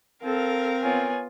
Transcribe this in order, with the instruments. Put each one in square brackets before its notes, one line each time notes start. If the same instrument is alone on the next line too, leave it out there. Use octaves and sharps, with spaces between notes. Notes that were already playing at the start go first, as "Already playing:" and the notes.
[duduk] C4 [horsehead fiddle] A4 [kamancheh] A#4 F5
[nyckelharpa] B3 F4 [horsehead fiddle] C#5 G#5